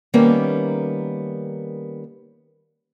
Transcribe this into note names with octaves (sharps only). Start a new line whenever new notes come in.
D#3 G3 A#3 B3 C#4